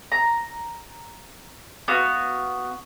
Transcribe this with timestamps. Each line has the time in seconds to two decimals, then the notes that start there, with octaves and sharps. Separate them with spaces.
0.12 A#5
1.88 B3 F#4 F5